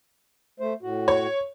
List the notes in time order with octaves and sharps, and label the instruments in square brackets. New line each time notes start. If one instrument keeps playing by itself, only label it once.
[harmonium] A3 C5
A2 F#4
[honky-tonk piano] C#5